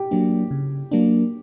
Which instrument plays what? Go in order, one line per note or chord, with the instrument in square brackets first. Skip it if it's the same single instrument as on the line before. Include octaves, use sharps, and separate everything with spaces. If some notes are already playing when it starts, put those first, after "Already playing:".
Already playing: [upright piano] G4
[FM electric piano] F#3 A#3 D4
C#3
F#3 A#3 D4